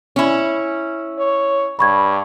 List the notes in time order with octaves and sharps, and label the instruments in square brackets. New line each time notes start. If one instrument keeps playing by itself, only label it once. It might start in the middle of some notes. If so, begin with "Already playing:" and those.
[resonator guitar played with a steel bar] C#4 E4
[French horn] C#5
[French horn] G2 [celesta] B5 C#6 G#6